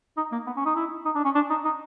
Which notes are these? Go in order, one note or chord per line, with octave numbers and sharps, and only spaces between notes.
D#4
A#3
B3
C#4
D#4
E4
D#4
D4
C#4
D4
D#4
D#4